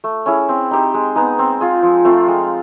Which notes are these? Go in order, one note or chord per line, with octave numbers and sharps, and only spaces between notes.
A3
C#4 E4 G#4
C4
D#4 G4 C5
G#3
B3 D#4 G#4
C4
F4 G#4
F3
A3 C4 F4
G#3